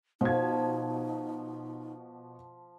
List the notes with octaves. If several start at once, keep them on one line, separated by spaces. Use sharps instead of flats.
B2 F3 D#4 G#6